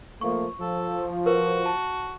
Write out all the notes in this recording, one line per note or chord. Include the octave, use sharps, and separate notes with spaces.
F3 A3 A#3 C#6
F3 A4
F#4 A#4 B4
A5